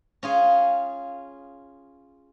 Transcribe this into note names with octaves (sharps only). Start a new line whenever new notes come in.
C#4 F4 G#4